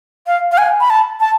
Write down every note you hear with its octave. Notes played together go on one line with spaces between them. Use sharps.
F5
F5
G#5
B5
A5
A5